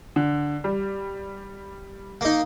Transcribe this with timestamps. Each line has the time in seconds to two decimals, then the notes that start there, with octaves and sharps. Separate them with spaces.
0.16 D3
0.64 G3
2.21 A#3 D#4